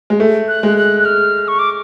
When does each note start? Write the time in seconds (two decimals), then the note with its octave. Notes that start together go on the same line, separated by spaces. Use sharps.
0.10 G#3
0.20 A3
0.48 F#6
0.63 G#3
0.77 F#6
1.00 F#6
1.05 F6
1.48 C#6
1.59 D6